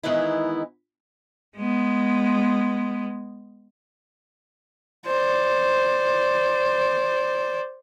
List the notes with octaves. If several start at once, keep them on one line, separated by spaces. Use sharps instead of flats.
D#3 E3 G#3 B3 D#4 E4
G#3 B3
C5 D5